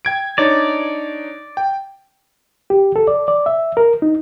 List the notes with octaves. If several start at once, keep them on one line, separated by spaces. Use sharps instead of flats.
G5 G#6 D7
D4 D#4 C#5 D5
G5
G4
A4
D5
D5
E5
A#4
D#4